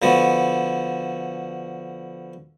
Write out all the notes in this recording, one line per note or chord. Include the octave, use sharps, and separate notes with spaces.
D3 F3 B3 F#4